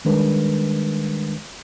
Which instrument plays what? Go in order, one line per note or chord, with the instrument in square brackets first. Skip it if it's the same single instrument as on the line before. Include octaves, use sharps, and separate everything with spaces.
[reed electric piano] D#3 G3 G#3 D4 A#4 B4